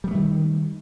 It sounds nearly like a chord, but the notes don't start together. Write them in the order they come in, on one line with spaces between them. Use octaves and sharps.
G3 B3 A3 D#3